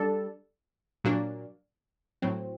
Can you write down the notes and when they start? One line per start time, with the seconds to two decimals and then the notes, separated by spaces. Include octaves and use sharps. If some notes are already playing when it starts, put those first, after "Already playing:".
Already playing: G3 D4 A4
1.04 A#2 F#3 A#3 D4
2.22 A2 F#3 C4